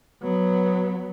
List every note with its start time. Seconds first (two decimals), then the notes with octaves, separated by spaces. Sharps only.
0.23 F#3 B3